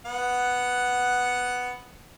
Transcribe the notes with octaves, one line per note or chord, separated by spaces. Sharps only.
B3 F#5